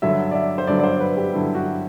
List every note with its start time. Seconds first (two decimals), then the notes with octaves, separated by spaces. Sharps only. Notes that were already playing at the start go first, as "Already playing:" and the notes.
0.02 G2 D3 F#3 E5
0.31 D5
0.35 E5
0.58 C5
0.67 G2 D3 F#3 D5
0.79 D5
0.84 C5
1.00 B4
1.17 G4
1.33 G2 D3 F#3 E4
1.55 F#4